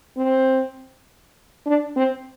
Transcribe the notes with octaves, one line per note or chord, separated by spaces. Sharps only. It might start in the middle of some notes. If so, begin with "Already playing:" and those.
C4
D4
C4